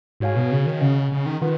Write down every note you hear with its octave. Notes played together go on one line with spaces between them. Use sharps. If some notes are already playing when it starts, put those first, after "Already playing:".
G#2 F#4 C#5 F5 G#5
B2
C#3
D#3
C#3 C#4 G#4 D#5 F#5
C#3
D#3
D#3 F4 B4 F#5